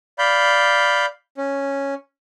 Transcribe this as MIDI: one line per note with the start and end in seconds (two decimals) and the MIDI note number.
0.19 1.06 74
0.19 1.06 77
0.19 1.06 83
0.19 1.06 91
1.37 1.94 61